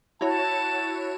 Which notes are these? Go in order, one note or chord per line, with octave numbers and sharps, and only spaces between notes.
E4 F#4 C#5 A5